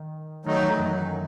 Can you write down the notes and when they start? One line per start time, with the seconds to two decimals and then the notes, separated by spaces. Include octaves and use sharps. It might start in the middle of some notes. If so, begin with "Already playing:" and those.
Already playing: D#3
0.45 D#3 F#3 A3 D#4
0.63 E3
0.79 F#2 F#3